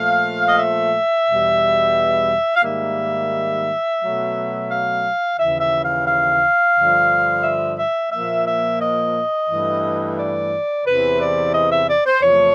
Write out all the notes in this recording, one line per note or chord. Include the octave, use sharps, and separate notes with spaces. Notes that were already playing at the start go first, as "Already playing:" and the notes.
Already playing: A#2 F3 A3 F5
D#5
E5
E2 B2 G3
F5
G#2 D#3 G3 A#3 E5
B2 F#3 A3
F5
D#2 C#3 E3 E5
E5
F5
F5
G2 D3 F3
E5
E5
A#2 F3 A#3 E5
E5
D#5
G2 E3 A3
D5
E2 C3 E3 B4
D5
D#5
E5
D5
C5
E2 C3 F3 A3 C#5